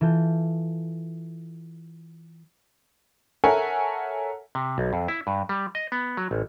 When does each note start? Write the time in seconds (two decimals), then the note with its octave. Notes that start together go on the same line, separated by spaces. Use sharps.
0.01 E3 F4 A4 G6
3.44 A4 A#4 C#5 E5 F#5 G#5
4.55 C3
4.78 B1
4.93 F2
5.08 E4
5.27 G2
5.49 G3
5.75 D#5
5.92 B3
6.17 F#3
6.31 A1